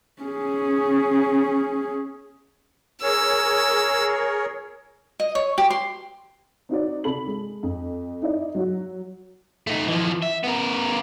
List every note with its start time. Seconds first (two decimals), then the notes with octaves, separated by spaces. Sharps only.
0.23 C#4 G#4
3.02 G#4 A#4 C#5 E6
5.20 D#5
5.35 C#5
5.58 G4
5.70 C6
6.69 C4 D#4 F#4 D5
7.04 C3 A4 B5 F#7
7.27 G#3
7.63 F2
8.22 D#4 E4 D5 D#5
8.55 F#3 F#4
9.67 A3 D#4
9.88 E3 F3
10.23 E5
10.44 B3 A#4